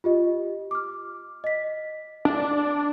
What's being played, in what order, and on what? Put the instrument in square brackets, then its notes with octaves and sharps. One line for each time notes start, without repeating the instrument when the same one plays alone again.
[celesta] F4 G4 D#5
D6 F6
D#5 B6
[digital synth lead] D4